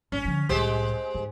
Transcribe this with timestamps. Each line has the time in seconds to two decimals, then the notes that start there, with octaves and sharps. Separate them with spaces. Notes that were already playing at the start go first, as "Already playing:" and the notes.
0.12 A1 G#2 C#4
0.25 D3 F3
0.49 C2 A2 G#3 G4 C5
1.15 G#2